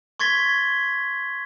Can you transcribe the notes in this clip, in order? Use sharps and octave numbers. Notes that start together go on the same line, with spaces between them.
C6 C#6 G#6 A6 B6 G7